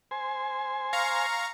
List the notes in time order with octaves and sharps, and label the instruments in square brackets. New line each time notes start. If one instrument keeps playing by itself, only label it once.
[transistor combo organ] C5 G#5
[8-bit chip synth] F5 A#5 C#6